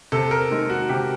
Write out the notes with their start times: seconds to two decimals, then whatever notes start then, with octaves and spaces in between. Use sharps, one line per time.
0.12 C3 A4
0.31 A#4
0.51 D#3 G#3
0.70 F#4
0.89 C3 G4